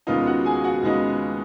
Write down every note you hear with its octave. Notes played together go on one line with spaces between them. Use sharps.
D#2 C#3 G#3 B3 D#4 F4 F5
F#4 F#5
G#4 G#5
F#4 F#5
D#2 C#3 G#3 B3 D#4